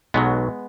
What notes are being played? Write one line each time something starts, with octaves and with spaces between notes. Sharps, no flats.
B1 B2 F#3 G#3 B3